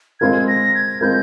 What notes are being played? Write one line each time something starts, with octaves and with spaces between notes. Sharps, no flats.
G#3 C4 F4 A#4 G#6
A#6
G#6
G#3 C4 F4 A#4 G6